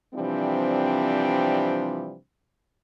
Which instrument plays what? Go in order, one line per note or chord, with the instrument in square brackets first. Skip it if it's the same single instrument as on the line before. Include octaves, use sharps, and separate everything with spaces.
[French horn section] C3 E3 F3 G3 C4 D4